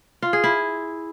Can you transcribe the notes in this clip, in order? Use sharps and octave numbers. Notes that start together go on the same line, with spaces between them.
F4
G#4
E4